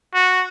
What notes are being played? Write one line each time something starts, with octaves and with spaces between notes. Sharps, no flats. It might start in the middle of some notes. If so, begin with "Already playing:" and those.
F#4